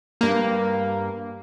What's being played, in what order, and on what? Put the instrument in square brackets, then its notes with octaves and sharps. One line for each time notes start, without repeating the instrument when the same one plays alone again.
[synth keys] G2 A#3